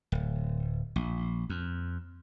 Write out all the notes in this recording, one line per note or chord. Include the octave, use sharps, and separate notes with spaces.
D1
A#1
F2